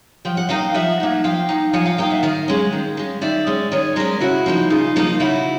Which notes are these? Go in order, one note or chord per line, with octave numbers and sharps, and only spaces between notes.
F3 G5
F#5
A#3 D#4 F5 G5
F3 E5 F#5
A#3 D#4
F3 F5 G5
A#3 D#4
F3 F#5 G#5
F5 G5
A#3 D#4 F5 G5
E5 F#5
D#3 D#5 F5
G#3 C#4
D#3
G#3 C#4
D#3 D5 E5
G#3 C#4
D#3 C#5 D#5
G#3 C#4 A#4 C5
C#3 E4 F#4
F3 A#3 D#4
C#3 D#4 F4
F3 A#3 D#4
C#3 E4 F#4